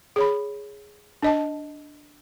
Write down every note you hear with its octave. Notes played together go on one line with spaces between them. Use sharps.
G#4 C#5 B5
D4 D#5 A5